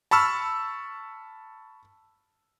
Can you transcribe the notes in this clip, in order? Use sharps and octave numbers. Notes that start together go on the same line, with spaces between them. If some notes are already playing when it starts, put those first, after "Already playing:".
A5 B5 C#6 E6 F6